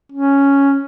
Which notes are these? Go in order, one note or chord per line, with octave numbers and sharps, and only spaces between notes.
C#4